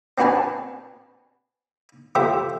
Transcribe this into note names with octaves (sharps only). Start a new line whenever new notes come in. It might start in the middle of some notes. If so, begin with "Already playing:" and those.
C4 D4 F#4 B4 G#5 A5
F3 A3 G4 C5 E5